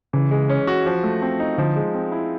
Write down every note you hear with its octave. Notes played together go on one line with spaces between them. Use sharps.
C#3 E3
G#3
C#4
F#4
F3
A3
C4
D#4
D3 F3
G#3
C4
E4